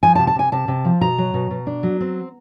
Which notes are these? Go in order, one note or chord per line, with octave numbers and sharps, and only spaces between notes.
F3 G#5
A5
C3
A5
C3 G#5
C3 A5
C3
F3
B2 A#5
F#3
B2
B2
D4
F#3
C4